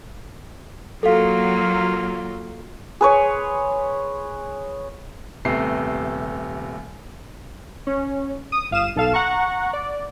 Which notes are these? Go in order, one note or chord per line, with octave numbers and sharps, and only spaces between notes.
F#3 A#3 F4 F#4 A4 F5
G#4 B4 C#5 C6
D#1 C3 A3 B3 C7
C#4
D#6
G1 F5 D#6 E7
B1 A4 F5 E7
F#5 A#5 C#6
D5